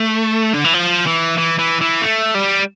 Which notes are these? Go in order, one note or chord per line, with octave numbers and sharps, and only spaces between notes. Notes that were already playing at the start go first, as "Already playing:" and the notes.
Already playing: A3
D3
E3
F3
E3
E3
E3
E3
A3
G3